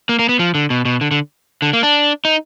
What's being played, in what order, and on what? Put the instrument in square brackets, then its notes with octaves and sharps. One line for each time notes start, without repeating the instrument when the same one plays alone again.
[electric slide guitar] A#3
A#3
B3
F3
D3
B2
B2
D3
D3
D3
A#3
D4
D#4